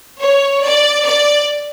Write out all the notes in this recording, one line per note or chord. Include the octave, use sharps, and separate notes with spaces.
C#5
D5
D5